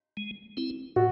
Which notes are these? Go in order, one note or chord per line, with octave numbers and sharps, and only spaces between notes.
G#3
C4 E4
A2 F#4